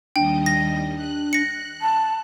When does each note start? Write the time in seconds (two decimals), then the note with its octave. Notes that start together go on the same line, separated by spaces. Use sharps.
0.16 D#2 G3 D4 D#5 G5
0.46 A#6
0.96 F#6
1.33 A#6 C#7
1.81 A5